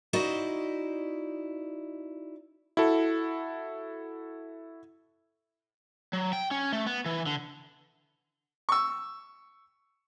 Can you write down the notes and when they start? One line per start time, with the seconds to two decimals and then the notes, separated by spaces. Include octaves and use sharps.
0.13 D#4 E4 F#4 C5 D5 D#5
2.77 E4 F#4 A4
6.13 F#3
6.33 G5
6.51 C#4
6.73 A3
6.86 B3
7.06 E3
7.26 D3
8.69 C#6 E6